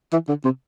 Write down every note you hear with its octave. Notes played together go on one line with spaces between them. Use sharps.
E3
D3
C3